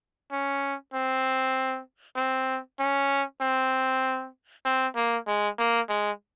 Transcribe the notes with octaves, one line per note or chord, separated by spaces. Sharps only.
C#4
C4
C4
C#4
C4
C4
A#3
G#3
A#3
G#3